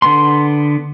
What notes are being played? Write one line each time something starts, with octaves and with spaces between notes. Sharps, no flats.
D3 B3 C6